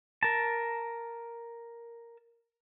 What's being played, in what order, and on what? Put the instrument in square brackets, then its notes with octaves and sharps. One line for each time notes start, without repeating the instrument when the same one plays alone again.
[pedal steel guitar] A#4 A5